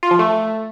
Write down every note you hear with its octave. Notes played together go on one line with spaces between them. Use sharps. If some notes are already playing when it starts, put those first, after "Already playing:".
F4
F3
A3